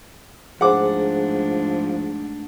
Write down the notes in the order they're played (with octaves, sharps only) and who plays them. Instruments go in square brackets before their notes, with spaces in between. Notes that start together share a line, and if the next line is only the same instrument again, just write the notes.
[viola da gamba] G#2 A3 D4 [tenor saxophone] F3 [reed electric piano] G#4 C5 [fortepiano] F#5 D6